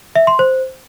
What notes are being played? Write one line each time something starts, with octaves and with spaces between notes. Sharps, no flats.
E5
C6
C5